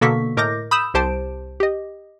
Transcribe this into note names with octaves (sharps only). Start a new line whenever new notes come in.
B2 D3 A#3 A4 C#6 B6
A2 A#4 D#5 D6 G6 A#6
B5 D#6 E6 G6 E7
C2 G4 C5 A5 D7
G4 D#5